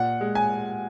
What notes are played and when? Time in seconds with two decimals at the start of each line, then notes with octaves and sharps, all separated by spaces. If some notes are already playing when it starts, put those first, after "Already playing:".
Already playing: A#2 F#5
0.21 G#3
0.35 G#5